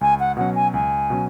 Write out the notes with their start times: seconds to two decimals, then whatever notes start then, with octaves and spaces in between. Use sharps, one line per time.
0.01 C#2 G#5
0.20 F#5
0.37 B2 F#3 C#4 F#5
0.55 G#5
0.74 C#2 G#5
1.10 B2 F#3 C#4